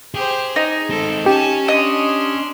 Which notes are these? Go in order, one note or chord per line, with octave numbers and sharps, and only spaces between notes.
G4 G#4 C5
D#4
G#3 C4 A4
C#4 G4 G#5 A5
D4 D#5 C6